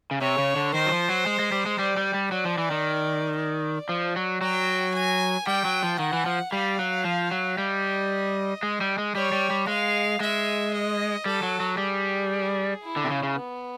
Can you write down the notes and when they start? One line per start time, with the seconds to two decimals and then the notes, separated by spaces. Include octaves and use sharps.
0.11 C#3
0.21 C3 C#5
0.38 C#3
0.56 D3
0.74 D#3 C5
0.86 F#3
0.92 F3
1.09 F#3
1.26 G#3
1.39 G#3
1.52 G3
1.66 G#3
1.79 G3 D5
1.97 G3
2.14 G3
2.32 F#3 D5
2.45 F3
2.58 E3
2.71 D#3
3.37 D5
3.89 F3
4.16 F#3
4.41 F#3 G5
4.94 G#5
5.47 G3 G5
5.65 F#3
5.83 F3
5.99 D#3 F#5
6.13 E3
6.26 F3
6.52 G3 F5
6.79 F#3
7.04 F3
7.31 F#3
7.57 G3 D#5
8.63 G#3
8.81 G3
8.98 G#3
9.15 G3 C#5
9.32 G3
9.51 G3
9.67 G#3 F5
10.20 G#3 E5
10.73 D#5
11.26 G3 A4
11.43 F#3
11.60 F#3
11.78 G3 G#4
12.83 E4
12.96 D3
13.04 C3
13.10 C#3
13.23 C#3
13.36 B3